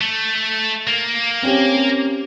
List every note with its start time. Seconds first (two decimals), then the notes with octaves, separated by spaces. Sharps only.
0.01 A3
0.87 A#3
1.43 C4 C#4 G4